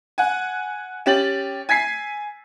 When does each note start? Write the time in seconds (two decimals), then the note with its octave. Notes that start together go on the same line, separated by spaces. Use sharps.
0.18 F#5 G#5
1.06 C#4 G4 A6 F#7
1.69 G#5 G#6 B6 C7